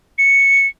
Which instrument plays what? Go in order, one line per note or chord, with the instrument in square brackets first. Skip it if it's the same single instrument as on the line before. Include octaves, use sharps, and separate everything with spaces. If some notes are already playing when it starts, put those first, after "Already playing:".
[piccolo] C#7